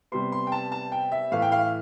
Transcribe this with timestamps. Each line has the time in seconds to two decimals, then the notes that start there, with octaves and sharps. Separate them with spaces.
0.12 C3 G3 B3 C6
0.32 C6
0.47 G5
0.52 A5
0.72 A5
0.92 G5
1.12 E5
1.32 A2 E3 A3 F5
1.42 G5
1.52 F5